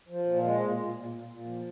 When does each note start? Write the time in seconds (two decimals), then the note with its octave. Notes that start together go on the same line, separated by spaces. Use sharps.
0.08 F3
0.25 A#2
0.42 G#3
0.59 A#2
0.77 A#2
0.94 A#2
1.11 A#2
1.28 A#2
1.45 F3